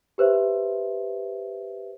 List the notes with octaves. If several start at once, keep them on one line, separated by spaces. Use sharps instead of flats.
G4 B4 C5 E5